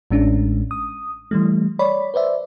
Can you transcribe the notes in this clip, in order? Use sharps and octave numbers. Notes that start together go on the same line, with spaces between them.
A1 A2 G#3 C#4 D4
D#6
E3 G3 A3
C#5 D5 B5
B4 C5 D5 E5